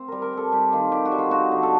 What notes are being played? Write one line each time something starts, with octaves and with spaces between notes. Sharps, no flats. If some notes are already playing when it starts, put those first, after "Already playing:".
Already playing: C4
G3 A#4
A#4
G3 A4
G3 G4
D#3 F4
G3 G4
F#4
G3
F4
D#4 F#4
D3
A4